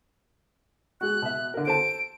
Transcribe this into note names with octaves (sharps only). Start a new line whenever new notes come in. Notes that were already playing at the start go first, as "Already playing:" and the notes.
G#3 F#4 F#6
B2 E5
D3 A#4
A4 C5 A5 D7